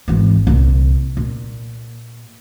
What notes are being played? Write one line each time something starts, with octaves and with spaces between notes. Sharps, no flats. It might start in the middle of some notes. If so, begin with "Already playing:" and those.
G#1 E3
C2 A#2
A#2